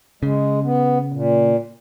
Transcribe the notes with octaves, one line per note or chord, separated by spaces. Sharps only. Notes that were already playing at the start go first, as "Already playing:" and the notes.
C#3 G#3
B3
A#2